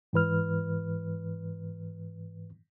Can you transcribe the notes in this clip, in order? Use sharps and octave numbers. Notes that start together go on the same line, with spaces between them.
G#2 E3 B4 F6